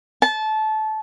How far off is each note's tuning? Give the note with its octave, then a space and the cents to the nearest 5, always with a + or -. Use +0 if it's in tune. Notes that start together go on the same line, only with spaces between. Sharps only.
A5 -20